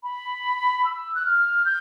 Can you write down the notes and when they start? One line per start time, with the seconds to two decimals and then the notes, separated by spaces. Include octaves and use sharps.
0.03 B5
0.85 E6
1.15 F#6
1.26 F6
1.65 G6